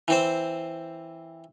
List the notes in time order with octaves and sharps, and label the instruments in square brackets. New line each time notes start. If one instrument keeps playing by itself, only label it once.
[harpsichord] E3 C4 C5